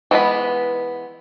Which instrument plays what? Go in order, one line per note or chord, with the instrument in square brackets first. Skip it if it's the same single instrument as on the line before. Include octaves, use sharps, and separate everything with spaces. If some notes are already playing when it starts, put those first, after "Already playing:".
[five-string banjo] E3 G#3 B3 B5